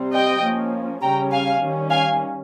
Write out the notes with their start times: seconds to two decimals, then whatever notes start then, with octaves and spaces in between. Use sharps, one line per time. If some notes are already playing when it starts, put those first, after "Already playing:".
Already playing: C3 G3 C4
0.13 D#5 G5
0.42 F3 A#3 C#4
1.02 C#3 G3 C#4 G5 A#5
1.31 F5 G#5
1.61 D#3 G3 C#4
1.91 F5 G#5